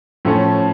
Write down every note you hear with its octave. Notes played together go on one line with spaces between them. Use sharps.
A2 F3 A3 C#4